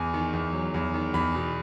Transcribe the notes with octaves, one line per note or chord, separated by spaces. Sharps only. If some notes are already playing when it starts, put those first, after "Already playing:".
Already playing: E2 G#5
D#3
E2
F#3
E2
D#3
E2 B5
B2